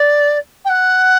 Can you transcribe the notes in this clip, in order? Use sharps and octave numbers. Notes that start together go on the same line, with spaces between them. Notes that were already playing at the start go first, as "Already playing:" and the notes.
Already playing: D5
G5
F#5